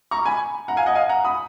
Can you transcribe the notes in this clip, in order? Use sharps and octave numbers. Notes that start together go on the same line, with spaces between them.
A#5 C#6
G#5 B5
F#5 A#5
F5 G#5
D#5 F#5
F5 G#5
F#5 A#5
B5 D#6